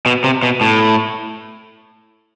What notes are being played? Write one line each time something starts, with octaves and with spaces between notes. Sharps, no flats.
B2
C3
B2
A2